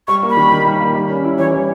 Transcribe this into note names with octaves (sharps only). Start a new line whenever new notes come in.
G3 C#6
A#3
B5
D#3
D#3
G3
A#3
G3
C#4
E4
E3 C#5
G3